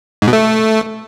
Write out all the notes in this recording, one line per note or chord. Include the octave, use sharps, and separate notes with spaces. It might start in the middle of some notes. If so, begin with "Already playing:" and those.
G#2
B2
A3